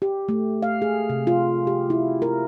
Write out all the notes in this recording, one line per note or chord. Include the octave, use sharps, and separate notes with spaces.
G4
A3
F5
G#4
C3
F4
G4
E4
A#4